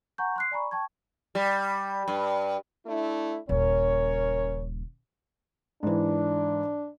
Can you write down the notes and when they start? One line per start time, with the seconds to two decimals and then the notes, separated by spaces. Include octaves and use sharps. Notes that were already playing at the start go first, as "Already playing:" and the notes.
0.18 F#5 G#5 A#5 C#6 G6
0.36 C6 F#6 C7
0.51 D5 G#5 A#5 B5 C#6
0.71 G5 A5 C#6 G#6
1.35 G3
2.08 G2
2.86 A3 D4 E4
3.49 D#1 C#3 C#4 A#4 C#5
5.83 G#2 E3 D4